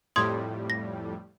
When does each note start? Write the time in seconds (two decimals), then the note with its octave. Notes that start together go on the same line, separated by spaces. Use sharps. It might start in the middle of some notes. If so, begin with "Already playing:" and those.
0.16 F2 A2 G3 C6 D#6 G#6
0.70 A#6